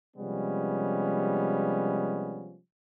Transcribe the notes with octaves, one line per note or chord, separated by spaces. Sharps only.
C3 F3 G3 G#3 B3 C#4